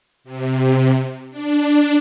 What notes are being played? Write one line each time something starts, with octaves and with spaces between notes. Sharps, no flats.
C3
D4